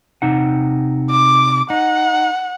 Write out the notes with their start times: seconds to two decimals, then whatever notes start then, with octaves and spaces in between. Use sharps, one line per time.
0.22 C3 D#4 F#5
1.10 D6
1.70 D#4 F#5